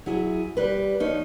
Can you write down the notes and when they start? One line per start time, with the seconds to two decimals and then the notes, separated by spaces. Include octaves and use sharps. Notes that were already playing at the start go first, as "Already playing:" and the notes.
0.06 F#3 E4 G#4
0.57 G3 B4
1.00 F3 D#4 C#5